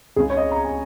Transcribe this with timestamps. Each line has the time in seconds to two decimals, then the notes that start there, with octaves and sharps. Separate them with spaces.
0.16 C#2 C#3 G#3 G#4
0.30 C#5
0.37 D#5
0.51 A#5
0.64 G#5